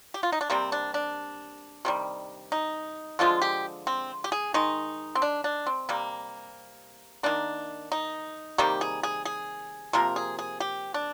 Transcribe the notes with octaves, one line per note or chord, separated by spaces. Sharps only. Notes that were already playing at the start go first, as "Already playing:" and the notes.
G4
F4
D#4
D4
C3 G3 A#3 C4
D4
D4
C3 D#3 G3
D#4
D3 F3 G#3 F4
G4
C4
G4
G#4
D#3 G#3 D#4
C4
D4
D4
C4
C3 G3 A#3
D#3 A#3 D4
D#4
C3 D#3 G3 A#3 G4
G#4
G#4
G#4
C3 F3 A#3 A#4
G#4
G#4
G4
D4